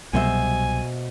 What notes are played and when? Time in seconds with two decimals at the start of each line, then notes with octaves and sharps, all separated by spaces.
0.13 C2 B2 F#3 G3 C5 E5 G#5